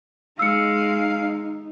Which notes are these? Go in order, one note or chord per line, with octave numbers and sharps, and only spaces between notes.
G#3 D#4 F5 E6 C#7